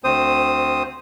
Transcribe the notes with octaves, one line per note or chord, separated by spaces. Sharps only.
D2 C4 C5 D#6